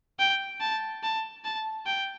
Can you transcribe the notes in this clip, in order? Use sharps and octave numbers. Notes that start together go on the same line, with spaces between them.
G5
A5
A5
A5
G5